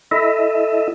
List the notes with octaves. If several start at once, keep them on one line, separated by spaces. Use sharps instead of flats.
E4 A4 D#5 E5